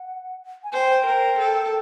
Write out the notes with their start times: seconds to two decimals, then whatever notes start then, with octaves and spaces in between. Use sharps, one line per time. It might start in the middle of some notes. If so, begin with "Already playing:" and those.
Already playing: F#5
0.64 G#5
0.73 C5 G5
1.06 A#4
1.39 A4